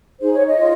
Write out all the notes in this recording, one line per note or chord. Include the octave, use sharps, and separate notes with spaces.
D#4 G#4 C5
C#5
D#5
F4